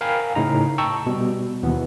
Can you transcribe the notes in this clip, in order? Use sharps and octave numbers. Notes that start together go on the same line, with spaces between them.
A#4 F5 G5 G#5 A#5 B5
A2 C#3 D#4 A#5
G5 A5 A#5 C#6 E6
B2 G3
D#2 B2 E3 B3